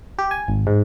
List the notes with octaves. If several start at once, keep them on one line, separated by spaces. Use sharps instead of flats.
G4
G#5
G#1
G#2